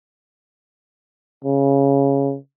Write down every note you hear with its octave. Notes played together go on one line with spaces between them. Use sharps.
C#3